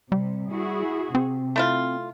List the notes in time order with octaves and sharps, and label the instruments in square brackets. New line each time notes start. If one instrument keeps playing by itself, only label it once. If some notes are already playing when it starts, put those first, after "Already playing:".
[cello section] C3 [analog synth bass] G3
[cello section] E4 F#4 G#4
[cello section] C3 [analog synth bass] C4
[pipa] A3 E4 F4